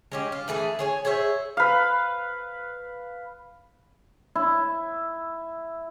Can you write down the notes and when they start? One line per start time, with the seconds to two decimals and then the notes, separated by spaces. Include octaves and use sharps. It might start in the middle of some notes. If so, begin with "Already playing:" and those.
0.12 G#3 C#4 G4
0.32 F4
0.48 E3 A3 G#4 B4
0.79 G#4 C#5 G#5
1.05 G#4 C5 C#5 E5
1.57 B4 F5
4.35 E4